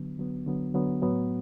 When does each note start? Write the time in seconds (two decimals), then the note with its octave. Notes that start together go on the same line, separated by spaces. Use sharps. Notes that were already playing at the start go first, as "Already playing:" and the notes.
Already playing: D3 F#3 B3
0.18 D3 F#3 B3
0.46 D3 F#3 B3
0.74 D3 F#3 B3
1.02 A2 F#3 B3